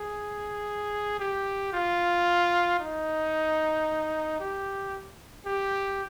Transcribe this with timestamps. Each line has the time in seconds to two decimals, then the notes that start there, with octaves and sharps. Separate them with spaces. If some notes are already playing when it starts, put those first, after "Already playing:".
Already playing: G#4
1.19 G4
1.73 F4
2.80 D#4
4.40 G4
5.46 G4